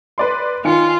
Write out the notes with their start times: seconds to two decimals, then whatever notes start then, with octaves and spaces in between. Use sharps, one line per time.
0.18 B4 D5 C6
0.65 D#3 F4 G#5 C#7